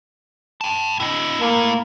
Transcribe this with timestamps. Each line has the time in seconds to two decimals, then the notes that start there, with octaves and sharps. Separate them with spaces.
0.61 G5 A5
1.00 E4 D#5
1.41 A3 A#3 E4